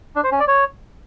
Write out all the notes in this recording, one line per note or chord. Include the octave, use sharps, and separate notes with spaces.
D4
C5
C#4
D5
C#5